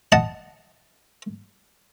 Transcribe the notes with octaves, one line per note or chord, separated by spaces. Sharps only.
D#5 F#5 A5